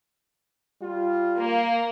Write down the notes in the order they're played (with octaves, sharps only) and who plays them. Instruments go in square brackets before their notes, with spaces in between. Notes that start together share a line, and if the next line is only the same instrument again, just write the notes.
[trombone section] G3 F4
[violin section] A#3